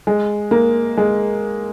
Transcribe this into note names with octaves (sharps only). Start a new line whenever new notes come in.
G#3
A#3
G#3